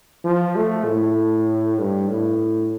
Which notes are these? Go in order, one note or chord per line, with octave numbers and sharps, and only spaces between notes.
F3
A3
A2
G2
A2